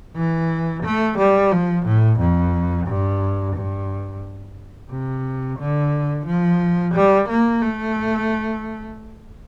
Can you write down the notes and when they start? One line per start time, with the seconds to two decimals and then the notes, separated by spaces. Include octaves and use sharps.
0.16 E3
0.83 A3
1.18 G3
1.52 F3
1.86 A2
2.20 F2
2.87 G2
3.56 G2
4.91 C3
5.59 D3
6.26 F3
6.94 G3
7.29 A#3
7.62 A3